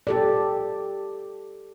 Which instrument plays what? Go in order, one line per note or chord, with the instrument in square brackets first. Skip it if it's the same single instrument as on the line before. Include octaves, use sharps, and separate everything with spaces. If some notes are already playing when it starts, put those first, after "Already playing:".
[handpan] G4 A4 D5